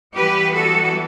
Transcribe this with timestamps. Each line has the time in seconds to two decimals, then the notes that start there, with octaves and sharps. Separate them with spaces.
0.15 E3 G3 B3 G4 B4
0.53 F#4 A4